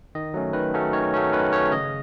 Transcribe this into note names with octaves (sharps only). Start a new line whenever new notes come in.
D#3 D#5
F#3 A3 C#4
D#3 B4
F#3 A3 C#4
D#3 C#5
F#3 A3 C#4
D#3 B4
F#3 A3 C#4 C#5
C#3 D#5